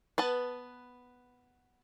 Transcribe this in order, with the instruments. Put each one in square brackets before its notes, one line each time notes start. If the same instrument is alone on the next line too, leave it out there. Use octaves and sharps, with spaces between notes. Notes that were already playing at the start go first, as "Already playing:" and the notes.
[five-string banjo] B3 B4 A5